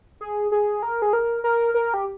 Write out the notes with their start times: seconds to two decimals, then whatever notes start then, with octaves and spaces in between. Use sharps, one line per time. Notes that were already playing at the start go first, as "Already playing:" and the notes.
0.21 G#4
0.52 G#4
0.83 A#4
1.02 G#4
1.13 A#4
1.44 A#4
1.74 A#4
1.94 G4